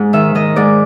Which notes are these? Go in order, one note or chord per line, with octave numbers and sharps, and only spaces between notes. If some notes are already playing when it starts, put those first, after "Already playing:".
Already playing: G#2
D#3 E5
D#3 D#5
G#2 D5